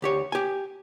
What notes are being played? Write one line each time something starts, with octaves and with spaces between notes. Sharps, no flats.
D2 G4 C#5
G4 G#5